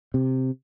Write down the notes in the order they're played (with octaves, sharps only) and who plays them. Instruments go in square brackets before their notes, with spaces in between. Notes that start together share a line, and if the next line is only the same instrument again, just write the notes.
[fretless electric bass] C3